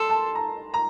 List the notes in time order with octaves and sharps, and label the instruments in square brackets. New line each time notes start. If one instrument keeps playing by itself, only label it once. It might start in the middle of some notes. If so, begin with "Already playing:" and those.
Already playing: [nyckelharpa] A4 [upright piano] C6
[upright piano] A5
A#5
A#5